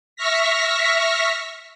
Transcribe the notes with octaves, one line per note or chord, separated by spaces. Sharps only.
E5 C#6 F6 A#6 B6